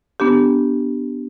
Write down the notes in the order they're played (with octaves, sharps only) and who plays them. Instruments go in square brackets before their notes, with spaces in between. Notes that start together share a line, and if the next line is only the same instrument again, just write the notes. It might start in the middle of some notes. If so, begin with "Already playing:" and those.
[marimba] B3 D4 G4